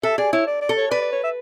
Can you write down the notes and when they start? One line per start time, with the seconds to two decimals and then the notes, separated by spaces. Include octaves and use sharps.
0.03 A4 E5
0.18 G#4 D5
0.33 E4 C#5
0.47 D5
0.61 D5
0.69 A4
0.77 C#5
0.91 B4 D5
1.01 D5
1.12 C#5
1.24 E5